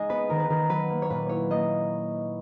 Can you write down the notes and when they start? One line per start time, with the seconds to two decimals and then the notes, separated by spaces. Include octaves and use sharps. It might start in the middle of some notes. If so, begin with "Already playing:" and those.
Already playing: G#3 D#4 D#5 G#5
0.09 B3 B4
0.30 D#3 A#4
0.40 B4
0.49 D#3 A#4
0.69 F#3 B4
0.90 A#3
1.02 C#5
1.10 A#2 B4
1.29 E4 C#5
1.50 A#3 D#5